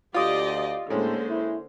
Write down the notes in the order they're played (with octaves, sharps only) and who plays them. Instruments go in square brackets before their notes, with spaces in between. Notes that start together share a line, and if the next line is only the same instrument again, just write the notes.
[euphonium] D2 [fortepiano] F4 D#6 [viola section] G4 D5 D#5
[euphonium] A2 [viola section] D3 A#3 C5 [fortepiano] G#3 C#4
[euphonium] E4